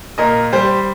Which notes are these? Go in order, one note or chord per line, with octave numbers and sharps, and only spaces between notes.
A#2 A#4 D#5
G3 G4 C5